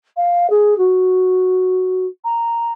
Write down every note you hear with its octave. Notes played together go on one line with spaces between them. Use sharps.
F5
G#4
F#4
A#5